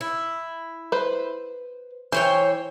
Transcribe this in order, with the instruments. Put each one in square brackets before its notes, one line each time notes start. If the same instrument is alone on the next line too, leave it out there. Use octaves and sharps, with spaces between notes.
[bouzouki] E4
[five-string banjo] B4 C5
[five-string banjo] E3 [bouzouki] C5 C#5 G5